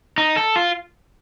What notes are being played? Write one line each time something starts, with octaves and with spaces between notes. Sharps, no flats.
D#4
A4
F4